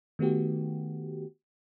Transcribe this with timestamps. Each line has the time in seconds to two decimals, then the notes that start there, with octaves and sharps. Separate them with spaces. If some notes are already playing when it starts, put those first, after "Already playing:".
0.19 D#3 A3 B3 F#4 G4